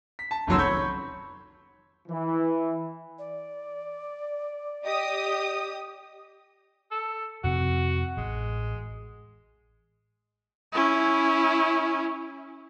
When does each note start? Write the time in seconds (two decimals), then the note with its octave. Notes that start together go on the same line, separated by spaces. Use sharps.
0.19 B6
0.31 A5
0.47 F1 C#2 D#3 F#3 C6 E6
0.58 C#5 B5 C#6 G6
2.08 E3
3.18 D5
4.85 G4 D#5 D#6
6.91 A4
7.44 F2 C3 C4 F#4
8.17 A1 G#3
10.72 C#4 E4